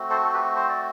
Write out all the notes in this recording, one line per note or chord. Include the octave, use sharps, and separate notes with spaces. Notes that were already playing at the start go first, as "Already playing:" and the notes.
Already playing: A3 C4 F#4
A4 C5
A4
G4 B4
C5
D5